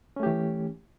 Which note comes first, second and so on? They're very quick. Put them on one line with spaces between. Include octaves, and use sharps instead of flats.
C#4 A3 G4 E3